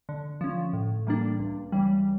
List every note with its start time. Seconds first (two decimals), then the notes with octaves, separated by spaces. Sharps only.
0.09 D3
0.41 F3 C#4
0.73 A2
1.07 E3 G3 A#3 D4
1.39 C#2
1.72 C#3 E3 G3